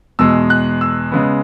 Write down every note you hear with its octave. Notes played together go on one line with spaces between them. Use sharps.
E2 B2 G#3 E6
F#6
E6
C#3 G#3 B3